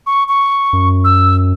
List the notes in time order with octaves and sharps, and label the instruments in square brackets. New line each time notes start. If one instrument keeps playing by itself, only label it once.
[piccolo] C#6
C#6
[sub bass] F#2
[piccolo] E6